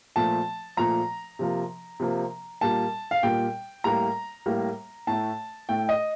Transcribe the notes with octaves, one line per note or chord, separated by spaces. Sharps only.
A#2 F3 A3 A5
A#2 F3 A3 A#5
C3 F3 A#3
C3 F3 A#3
A#2 G3 A#3 A5
F5
A#2 G3 A#3 G5
A2 G3 A#3 A#5
A2 G3 A#3
A2 A3 A5
A2 A3 G5
D#5